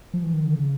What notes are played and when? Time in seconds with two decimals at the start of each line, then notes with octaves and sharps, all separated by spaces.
0.14 F3
0.24 E3
0.34 D#3
0.44 D3
0.55 C#3